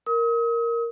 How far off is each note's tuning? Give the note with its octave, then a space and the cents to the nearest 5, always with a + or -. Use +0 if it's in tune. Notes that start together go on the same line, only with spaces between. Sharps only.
A#4 +0 D#6 +40